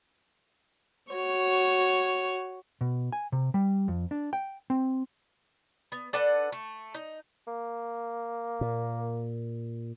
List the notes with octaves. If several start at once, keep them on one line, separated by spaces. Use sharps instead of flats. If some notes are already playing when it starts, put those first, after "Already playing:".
F#4 C#5
B2
G#5
C3
G3
F2
D4
G5
C4
B3
D4 A4 B4 F#5
A3
D#4
A#3
A#2